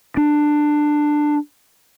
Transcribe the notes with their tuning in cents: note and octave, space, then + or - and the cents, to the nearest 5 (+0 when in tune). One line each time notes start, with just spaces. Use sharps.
D4 +15